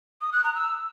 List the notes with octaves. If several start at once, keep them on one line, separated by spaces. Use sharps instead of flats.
D#6
F#6
A#5
E6